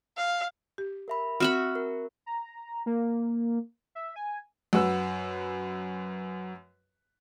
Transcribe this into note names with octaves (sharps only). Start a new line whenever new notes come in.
F5
G4
A#4 E5 B5
C4 F#4 E5 B5 F6
A#4
A#5
A#3
E5
G#5
F#2 F#4 B4 E6